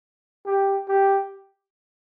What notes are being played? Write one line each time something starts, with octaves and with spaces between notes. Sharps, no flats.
G4
G4